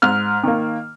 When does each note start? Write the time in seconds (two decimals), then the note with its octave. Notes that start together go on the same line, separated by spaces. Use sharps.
0.02 G#2 F6
0.43 D#3 A#3